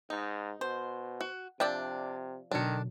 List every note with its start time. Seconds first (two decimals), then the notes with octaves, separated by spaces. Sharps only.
0.10 G#2 D#4
0.61 B2 C5
1.21 F#4
1.60 C3 F3 D4 D5 E5 G5
2.51 B2 D3 D#3 F#3 D4 A4